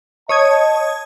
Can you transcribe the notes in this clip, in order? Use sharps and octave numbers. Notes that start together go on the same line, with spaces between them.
C#5 D#5 A5 D#6 G#6